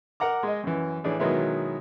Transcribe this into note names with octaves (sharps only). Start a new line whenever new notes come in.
A#4 F#5 A#5 D6
G#3 D#5
F#2 E3
A2 E3 D4 G#4
B2 D#3 F#3 G#3 B3 E4